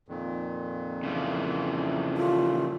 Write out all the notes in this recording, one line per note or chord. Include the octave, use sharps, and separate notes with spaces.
F2 A#2 D#3
C#3 E3 F3
D#2 A#2 A3 F4